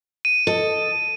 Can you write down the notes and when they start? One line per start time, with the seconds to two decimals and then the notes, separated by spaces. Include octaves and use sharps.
0.25 D#7
0.47 A4 D#5